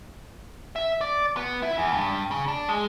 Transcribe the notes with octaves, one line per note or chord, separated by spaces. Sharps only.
E5
D5
B3
E4
E2
G2
C#3
D4
G#3